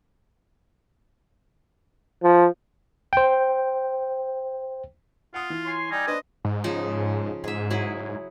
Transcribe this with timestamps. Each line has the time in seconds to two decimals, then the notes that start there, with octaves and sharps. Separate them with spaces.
2.23 F3
3.13 C5 G5
5.34 F4 F#5 D#6
5.50 E3
5.66 C#5 G#5 C6
5.91 G3 D#4 D5 G#5
6.07 D4 B4 C5 D#5
6.45 G#2
6.64 C#3 F3 D#4
7.44 G#2 G#4 E5
7.70 F#3 E4 G#4